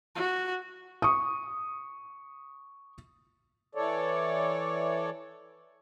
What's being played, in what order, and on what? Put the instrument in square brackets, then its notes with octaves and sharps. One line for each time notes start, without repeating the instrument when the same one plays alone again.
[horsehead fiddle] F#4
[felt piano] C#6 D#6
[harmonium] E3 A4 C#5 D5